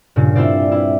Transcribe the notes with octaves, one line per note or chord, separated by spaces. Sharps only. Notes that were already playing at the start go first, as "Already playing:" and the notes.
G2 A#2 C#3
C4 E4 F4 B4 C5 D5
E4